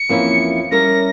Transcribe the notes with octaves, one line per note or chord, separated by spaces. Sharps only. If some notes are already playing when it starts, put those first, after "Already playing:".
Already playing: C#7
F2 E3 A#3 C#4 E4
G3 C#4 E4 A#4 E5 A#6